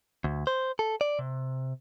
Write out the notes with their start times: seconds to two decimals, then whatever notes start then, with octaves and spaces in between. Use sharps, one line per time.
0.24 D2
0.47 C5
0.79 A4
1.01 D5
1.19 C3